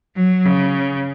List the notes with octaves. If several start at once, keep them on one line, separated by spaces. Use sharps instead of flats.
F#3
C#3